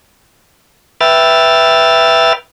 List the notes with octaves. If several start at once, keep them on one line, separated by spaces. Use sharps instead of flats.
B4 E5 G5 F6 A6